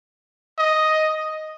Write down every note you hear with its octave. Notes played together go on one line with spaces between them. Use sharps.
D#5